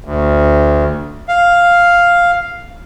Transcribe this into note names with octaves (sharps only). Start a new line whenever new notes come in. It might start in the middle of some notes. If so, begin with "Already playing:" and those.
D2
F5